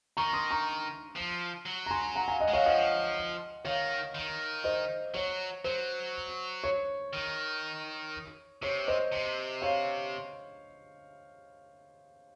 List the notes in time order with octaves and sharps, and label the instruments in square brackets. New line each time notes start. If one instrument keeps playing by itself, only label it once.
[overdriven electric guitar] D#3 [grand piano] A#5 C#6
[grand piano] C6 D#6
A#5 C#6
[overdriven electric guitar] F3
F#3
[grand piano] A#5
G#5 C6
F#5 A#5
F5 G#5
D#5 F#5
[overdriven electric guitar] G#3
[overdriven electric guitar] F#3 [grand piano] C#5 F5
[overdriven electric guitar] F3 [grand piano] D#5 F#5
[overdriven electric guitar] D#3 [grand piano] C#5 F5
[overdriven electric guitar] D#3
[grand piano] C5 D#5
[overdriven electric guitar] F#3 [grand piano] C#5
[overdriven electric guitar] F#3 [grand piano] C5
[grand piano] C#5
[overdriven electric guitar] D#3
[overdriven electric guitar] C3 [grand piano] C#5
[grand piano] C5 D#5
[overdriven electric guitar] C3
[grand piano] C#5 F5